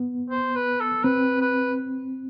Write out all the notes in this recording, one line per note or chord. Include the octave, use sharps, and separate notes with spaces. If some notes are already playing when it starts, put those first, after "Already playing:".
Already playing: B3
C5
B4
A4
C4 B4
B4